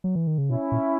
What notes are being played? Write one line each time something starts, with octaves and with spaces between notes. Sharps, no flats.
F#3
E3
D#3
C#3
B2 C#4 E4
A#2